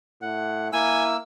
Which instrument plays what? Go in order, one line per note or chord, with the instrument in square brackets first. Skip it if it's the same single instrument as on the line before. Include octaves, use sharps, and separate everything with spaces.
[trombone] A2 [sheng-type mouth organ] F#5
[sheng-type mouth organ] A#3 E6 [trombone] E4 [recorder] G#5